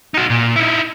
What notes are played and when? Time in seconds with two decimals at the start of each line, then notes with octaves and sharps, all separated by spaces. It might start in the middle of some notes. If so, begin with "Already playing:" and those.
0.14 D#4 F#4
0.30 A#2
0.56 D#4 E4